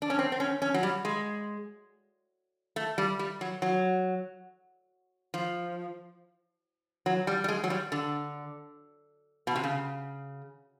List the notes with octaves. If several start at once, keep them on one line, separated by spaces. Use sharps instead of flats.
D4
C#4
C4
C4
C#4
C#4
F#3
G3
G#3
A3
G3
G3
F#3
F#3
F3
F#3
G3
G3
G#3
F#3
G3
D3
B2
C3
C#3